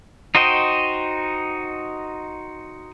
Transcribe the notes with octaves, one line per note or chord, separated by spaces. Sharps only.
D#4 F#4 C5 D#5 G5